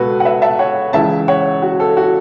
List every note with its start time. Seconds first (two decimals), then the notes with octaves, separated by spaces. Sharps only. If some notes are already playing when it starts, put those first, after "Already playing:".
Already playing: C#2 B2 F#4 A4 B4
0.20 F#5
0.25 B4 E5
0.42 E5 A5
0.59 C#5 F#5
0.93 C#2 C#3 E3 E5 A5
1.28 C#5 F#5
1.62 F#4
1.80 A4
1.97 F#4